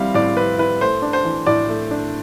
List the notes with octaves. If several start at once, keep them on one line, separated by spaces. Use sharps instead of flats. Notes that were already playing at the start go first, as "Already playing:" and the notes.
Already playing: G3 C4 E4 F5
A2 D5
C4 B4
E4 B4
A3 C5
D4
C5
E3
A2 D5
A3
D4